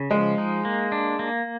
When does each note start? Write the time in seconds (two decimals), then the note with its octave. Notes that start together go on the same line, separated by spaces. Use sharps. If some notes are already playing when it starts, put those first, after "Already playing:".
Already playing: C#3
0.11 F3 G#3
0.38 D#4
0.65 A#3
0.92 D4
1.19 A#3